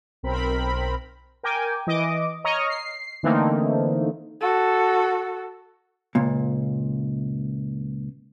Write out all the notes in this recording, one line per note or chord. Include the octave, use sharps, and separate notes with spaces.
B1 C4 A#4 B5
A#4 G5 G#5 D6
E3 D#5 D6
C#5 D#5 A#5 C#6 D#6 F6
C7
D3 E3 A3 A#3 C4 D#4
F#4 A4
C#2 A#2